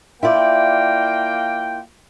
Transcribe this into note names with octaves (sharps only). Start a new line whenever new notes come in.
A#3 E4 F4 D5 G5